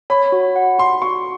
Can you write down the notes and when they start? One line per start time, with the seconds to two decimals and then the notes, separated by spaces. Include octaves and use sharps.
0.10 C#5 B5
0.32 F#4
0.56 F#5
0.79 F#4 C6
1.02 F#4 C#6